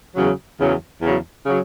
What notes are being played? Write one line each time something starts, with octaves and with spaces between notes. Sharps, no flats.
E2 C#3 F#3
E2 C#3 F#3
E2 C#3 F#3
C#3 F#3